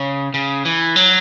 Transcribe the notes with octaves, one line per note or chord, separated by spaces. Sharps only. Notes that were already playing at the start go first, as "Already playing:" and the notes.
Already playing: C#3
C#3
E3
F#3